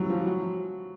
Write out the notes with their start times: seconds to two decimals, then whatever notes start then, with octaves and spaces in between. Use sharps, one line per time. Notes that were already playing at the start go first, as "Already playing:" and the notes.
Already playing: E3 F#3 G3
0.10 F3
0.27 F#3